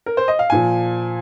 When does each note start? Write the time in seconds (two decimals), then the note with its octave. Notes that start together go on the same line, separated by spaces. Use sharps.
0.06 A#4
0.17 C5
0.28 D#5
0.39 F5
0.50 A#2 F3 G#5